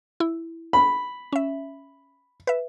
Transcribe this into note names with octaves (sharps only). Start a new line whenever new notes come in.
E4
B5
C#4 E5
B4 E5